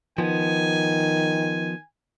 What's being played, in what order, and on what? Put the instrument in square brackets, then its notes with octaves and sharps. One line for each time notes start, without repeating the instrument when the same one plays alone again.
[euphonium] D#3 [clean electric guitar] F3 B3 [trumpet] G#5